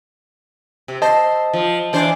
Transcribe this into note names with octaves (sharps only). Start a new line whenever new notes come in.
C3
C5 D#5 A5
F3
E3 D4 C5